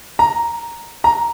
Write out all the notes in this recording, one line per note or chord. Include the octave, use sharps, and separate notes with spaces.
A#5
A#5